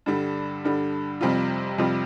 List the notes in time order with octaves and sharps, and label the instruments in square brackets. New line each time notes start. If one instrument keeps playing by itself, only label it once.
[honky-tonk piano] G2 D3 G3
G2 D3 G3
F2 C3 G3 C4 F4
F2 C3 G3 C4 F4